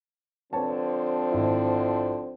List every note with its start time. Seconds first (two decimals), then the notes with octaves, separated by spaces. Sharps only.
0.53 D3 F3 C4 B4 C#5 A5
1.32 G#1 E4